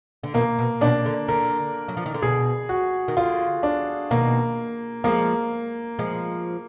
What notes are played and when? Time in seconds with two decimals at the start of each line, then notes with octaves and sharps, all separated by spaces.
0.23 D3
0.34 B2 D#3 A#3
0.59 B2
0.81 B2 D#3 D4
1.06 D3
1.28 D3 A#4
1.88 F#3
1.97 F3
2.06 D#3
2.14 D3
2.22 B2 G#4
2.69 F#4
3.08 D#3
3.17 D3 F4
3.63 D4
4.11 B2 D#3 A#3
5.04 F3 G#3 A#3
5.99 F3 G#3